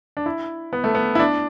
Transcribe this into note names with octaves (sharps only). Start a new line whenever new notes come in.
D4
E4
B3
A3
B3
E4
D4